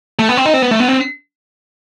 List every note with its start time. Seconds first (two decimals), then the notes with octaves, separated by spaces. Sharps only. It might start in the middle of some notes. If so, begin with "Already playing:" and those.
0.19 A3
0.29 B3
0.37 C4
0.46 D#4
0.54 C4
0.62 B3
0.71 A3
0.80 B3
0.88 C4